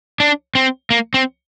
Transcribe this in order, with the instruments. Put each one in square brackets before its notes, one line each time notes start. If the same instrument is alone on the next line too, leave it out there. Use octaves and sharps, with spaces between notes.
[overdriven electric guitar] D4
C4
A#3
C4